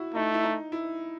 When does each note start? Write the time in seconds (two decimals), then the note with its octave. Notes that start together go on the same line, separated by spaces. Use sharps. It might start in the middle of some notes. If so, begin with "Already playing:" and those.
Already playing: E4 F#4
0.14 A3 D#4
0.34 E4
0.43 D#4
0.72 E4